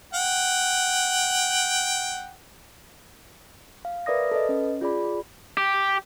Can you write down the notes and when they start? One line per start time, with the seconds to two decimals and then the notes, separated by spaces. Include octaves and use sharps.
0.14 F#5 G5
3.85 F5
4.06 A#4 B4 D5 E5 D#6 A#6
4.32 A4 B4 D#5
4.49 C#4
4.81 F4 G#4 D5 B5
5.57 G4